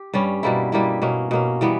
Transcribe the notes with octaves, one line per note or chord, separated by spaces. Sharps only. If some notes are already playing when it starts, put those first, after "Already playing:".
Already playing: G4
G2 G3 C#4
B2 G3 A#3 E4
B2 G3 A#3 E4
B2 A#3 C#4
B2 A#3 C#4
E3 G3 B3